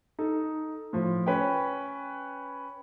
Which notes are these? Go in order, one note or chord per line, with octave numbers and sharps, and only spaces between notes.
D#4 A4
A2 F3
C#4 B4 C#5 G5